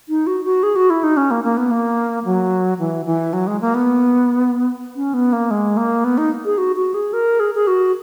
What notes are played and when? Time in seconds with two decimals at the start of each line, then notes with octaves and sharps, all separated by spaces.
0.09 D#4
0.27 F#4
0.44 F#4
0.63 G#4
0.76 F#4
0.90 E4
1.04 D#4
1.17 C#4
1.31 A#3
1.44 A#3
1.57 B3
1.71 A#3
2.25 F#3
2.79 E3
3.06 E3
3.33 F#3
3.47 G#3
3.61 A#3
3.74 B3
4.96 C#4
5.14 B3
5.33 A#3
5.51 G#3
5.77 A#3
6.04 B3
6.18 D#4
6.45 G#4
6.58 F#4
6.76 F#4
6.94 G#4
7.13 A#4
7.40 G#4
7.55 G#4
7.67 F#4